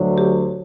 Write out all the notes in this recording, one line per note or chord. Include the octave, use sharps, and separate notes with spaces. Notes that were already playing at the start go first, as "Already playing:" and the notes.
Already playing: D2 D3 F#3
G4